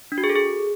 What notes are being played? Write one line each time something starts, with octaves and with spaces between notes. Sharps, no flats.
D4
F#4
G#4
A4
G#4